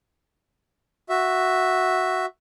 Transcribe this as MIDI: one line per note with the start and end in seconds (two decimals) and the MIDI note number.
1.09 2.26 66
1.09 2.26 76